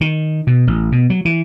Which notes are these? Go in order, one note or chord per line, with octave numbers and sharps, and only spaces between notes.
D#3
B2
A1
B2
F#3
E3